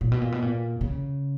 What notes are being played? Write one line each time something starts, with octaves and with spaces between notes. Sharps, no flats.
A#2
B2
A#2
B2
A#2
C#3